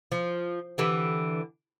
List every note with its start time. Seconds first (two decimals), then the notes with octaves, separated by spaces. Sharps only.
0.12 F3
0.78 D3 E3 G4